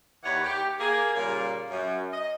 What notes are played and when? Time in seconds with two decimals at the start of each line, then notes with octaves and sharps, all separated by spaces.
0.23 D#2 E3 B4 C#5 D5 F#5
0.44 G4
0.80 A#3 G#4
1.15 A#2 C#3 G3 A#3
1.69 F#2
2.11 D#5